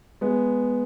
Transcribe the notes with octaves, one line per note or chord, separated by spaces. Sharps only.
G#3 B3